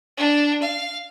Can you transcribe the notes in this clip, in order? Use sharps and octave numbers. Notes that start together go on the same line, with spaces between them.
D4
F5